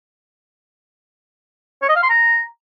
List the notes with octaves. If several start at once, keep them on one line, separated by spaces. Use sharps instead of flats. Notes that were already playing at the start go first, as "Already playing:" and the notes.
C#5
D#5
F5
C6
A#5